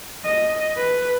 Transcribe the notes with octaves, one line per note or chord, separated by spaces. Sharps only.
D#5
B4